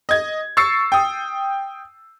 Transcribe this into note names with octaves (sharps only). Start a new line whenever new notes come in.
D#5 G#6
C#6 E6 A6 C7 C#7
G5 D#6